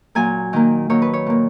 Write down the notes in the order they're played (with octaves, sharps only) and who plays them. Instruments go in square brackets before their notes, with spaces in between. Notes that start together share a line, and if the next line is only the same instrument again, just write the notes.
[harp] A#2 F#3 A#3 G#5
D#3 A#3
D#3 F#3 A#3 C#5
B4
C#5
A#2 A#3